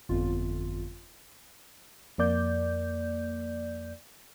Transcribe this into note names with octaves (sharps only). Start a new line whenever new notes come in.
G1 F2 F4
F2 A#3 D5 G6